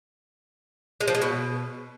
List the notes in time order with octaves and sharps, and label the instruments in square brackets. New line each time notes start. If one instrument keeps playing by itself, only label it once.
[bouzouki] G#3
F3
G#3
B2